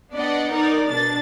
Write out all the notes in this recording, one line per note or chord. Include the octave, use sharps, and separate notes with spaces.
B3 D4 D5 D#5 F#5
D#4 A#4 D5
B2 D4 A6